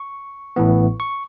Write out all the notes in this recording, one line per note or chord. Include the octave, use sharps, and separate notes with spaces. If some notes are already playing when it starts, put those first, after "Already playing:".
Already playing: C#6
A1 A2 E3 B3
C#6